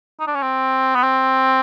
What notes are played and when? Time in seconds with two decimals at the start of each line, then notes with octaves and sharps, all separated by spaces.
0.20 D#4
0.27 D4
0.35 C#4
0.43 C4
0.96 B3
1.03 C4